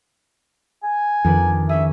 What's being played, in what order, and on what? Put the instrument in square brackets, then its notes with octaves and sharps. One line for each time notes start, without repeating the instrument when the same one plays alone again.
[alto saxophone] G#5
[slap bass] F2 [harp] D#3 D4 B4
[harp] C#4 G#4 [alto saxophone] E5